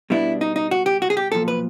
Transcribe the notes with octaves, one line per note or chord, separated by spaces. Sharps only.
B2 G3 B3 D4 E4
D#4
D#4
F#4
G4
F#4
G#4
G4
B1 A#2 F3 A4
B4